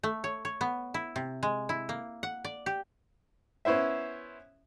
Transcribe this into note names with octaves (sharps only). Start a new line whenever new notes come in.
A3
C#5
C#5
B3
E4
C3
G#3
E4
A#3
F#5
D5
G4
B3 C#4 E4 C5 E5